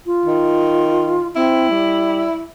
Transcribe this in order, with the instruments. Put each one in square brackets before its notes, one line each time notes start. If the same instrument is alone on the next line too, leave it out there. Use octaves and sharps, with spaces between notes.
[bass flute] F4
[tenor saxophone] D#3
[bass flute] C4 [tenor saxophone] E4
[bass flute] G3